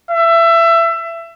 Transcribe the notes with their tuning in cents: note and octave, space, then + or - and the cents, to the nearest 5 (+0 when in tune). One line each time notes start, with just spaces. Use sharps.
E5 +25